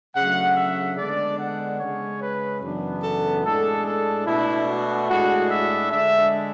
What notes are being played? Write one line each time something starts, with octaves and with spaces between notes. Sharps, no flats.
C#3 F#3 A3 D4 F#5
E5
D3 G#3 B3 D4 D5
F#5
C#3 G#3 C#4 C#5
B4
F#2 C#3 E3 B3 D4
A4
A2 G#3 D4 A4
A4
B2 A3 D4 E4
F#4
A2 G#3 D4 F#4
E5
D3 G#3 D4 E5